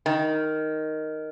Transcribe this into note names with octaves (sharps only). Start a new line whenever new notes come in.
D#3